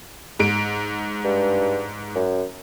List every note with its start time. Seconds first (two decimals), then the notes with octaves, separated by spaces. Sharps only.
0.39 G#2 D7
1.24 G2
2.16 F#2